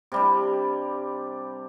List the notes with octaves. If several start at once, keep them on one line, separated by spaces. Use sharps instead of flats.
C3 G3 D4